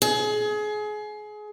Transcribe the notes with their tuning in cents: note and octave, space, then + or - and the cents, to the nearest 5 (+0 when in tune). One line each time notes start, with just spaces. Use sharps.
G#4 +25